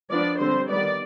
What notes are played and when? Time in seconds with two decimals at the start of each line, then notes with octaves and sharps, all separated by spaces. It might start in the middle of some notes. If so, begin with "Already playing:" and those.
0.10 F3 B3 D4 D5
0.39 D3 G3 C4 C5
0.69 D#3 G3 B3 D5